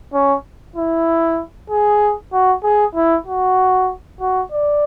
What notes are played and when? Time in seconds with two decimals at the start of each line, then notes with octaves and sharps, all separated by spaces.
0.14 C#4
0.76 E4
1.70 G#4
2.33 F#4
2.64 G#4
2.95 E4
3.27 F#4
4.20 F#4
4.52 D5